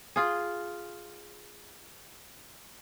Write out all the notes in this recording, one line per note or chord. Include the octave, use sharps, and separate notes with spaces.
F4 G#4